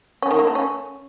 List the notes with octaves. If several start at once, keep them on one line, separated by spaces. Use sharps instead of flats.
C#4
D#3
A#3
A3
C#4